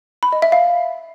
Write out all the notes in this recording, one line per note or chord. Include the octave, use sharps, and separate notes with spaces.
B5
D#5
E5
F5